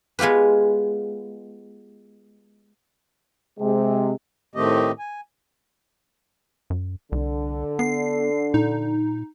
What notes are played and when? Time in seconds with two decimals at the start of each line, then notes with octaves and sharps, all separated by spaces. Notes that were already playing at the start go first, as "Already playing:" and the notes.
0.19 G#3 B3 F4 G4 B4
3.60 C3 G#3
4.55 A2 D#3 A3 C4 G4 D#5
4.99 G#5
6.70 F#2
7.12 C2 D3
7.79 B3 C7
8.54 A#2 D#4